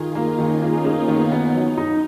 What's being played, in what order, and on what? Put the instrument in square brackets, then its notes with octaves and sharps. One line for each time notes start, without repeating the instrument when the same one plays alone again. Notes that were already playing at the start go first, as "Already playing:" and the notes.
Already playing: [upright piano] D#3 [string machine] F4 G#4
[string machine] D#4
[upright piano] A#3
[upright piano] D#3 [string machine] C#4
[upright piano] A#3
[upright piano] A#3 [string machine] B3
[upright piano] D#3
[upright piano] B3 [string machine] D#4
[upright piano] F#3
D#4